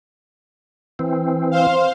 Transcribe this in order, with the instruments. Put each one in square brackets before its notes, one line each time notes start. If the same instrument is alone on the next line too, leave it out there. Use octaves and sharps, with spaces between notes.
[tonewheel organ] E3 C4
[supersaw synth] C5 F5